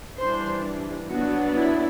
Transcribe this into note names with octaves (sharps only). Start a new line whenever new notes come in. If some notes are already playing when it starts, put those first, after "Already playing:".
E3 G3 D4 C5
F#3 B3 D4 F#4
E4